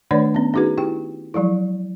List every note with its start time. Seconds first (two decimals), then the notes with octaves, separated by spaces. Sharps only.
0.11 D#3 A3 D4 B4 C#5 D5
0.34 B3 C#4
0.54 C#4 D#4 F#4 G#4 B4
0.78 E4 G4 G5
1.34 F3 F#3 G#3 E4